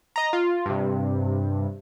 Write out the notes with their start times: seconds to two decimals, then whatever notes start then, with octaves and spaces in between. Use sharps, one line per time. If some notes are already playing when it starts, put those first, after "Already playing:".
0.16 D#5 A#5
0.33 F4
0.65 G2 C3